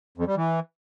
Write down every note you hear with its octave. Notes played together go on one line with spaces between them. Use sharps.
F2
G3
E3